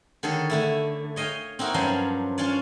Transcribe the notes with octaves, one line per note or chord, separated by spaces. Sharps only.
D3 D#3 G#4 A4 C#5
D3 A3 E4
C#5 D#5 F5 G5 G#5
C4 D#4 E4 F#4 A#4
G2 F3 F#3 C#4 D4 C5
C#4 D4 F4 C#5 D5